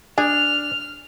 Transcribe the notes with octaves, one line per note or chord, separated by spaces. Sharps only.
D4 G#4 F6